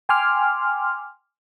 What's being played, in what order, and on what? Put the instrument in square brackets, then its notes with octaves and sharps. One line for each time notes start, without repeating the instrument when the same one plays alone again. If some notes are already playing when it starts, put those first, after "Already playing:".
[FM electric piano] G5 G#5 C6 D6 F6